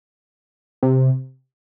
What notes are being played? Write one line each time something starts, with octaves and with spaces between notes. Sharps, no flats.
C3